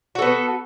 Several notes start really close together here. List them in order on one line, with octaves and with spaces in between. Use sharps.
F#4 A4 B3